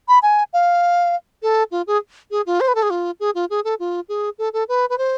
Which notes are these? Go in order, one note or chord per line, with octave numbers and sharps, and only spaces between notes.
B5
G#5
F5
A4
F4
G#4
G#4
F4
C5
B4
A4
G#4
F4
G#4
F4
G#4
A4
F4
G#4
A4
A4
B4
B4
C5